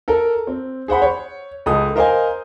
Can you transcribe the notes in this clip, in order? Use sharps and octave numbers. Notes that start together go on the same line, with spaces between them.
A4 A#4
C4
G#4 C5 F#5 B5
C#5
C#2 G#3 A4 D#6
A#4 C5 D#5 F5 G#5